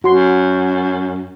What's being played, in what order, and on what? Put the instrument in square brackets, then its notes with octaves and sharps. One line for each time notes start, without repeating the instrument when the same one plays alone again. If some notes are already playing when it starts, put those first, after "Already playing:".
[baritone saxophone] F#2 [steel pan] F#4 C6